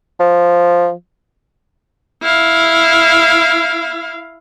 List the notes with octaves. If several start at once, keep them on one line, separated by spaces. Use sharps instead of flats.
F3
E4 F5